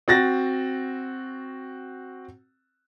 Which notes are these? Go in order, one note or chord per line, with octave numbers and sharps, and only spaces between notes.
C4 F#4 A6 A#6